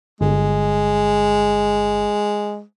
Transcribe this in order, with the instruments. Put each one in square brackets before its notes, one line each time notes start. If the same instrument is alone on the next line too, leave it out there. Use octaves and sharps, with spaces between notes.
[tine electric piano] G1 [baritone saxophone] G#3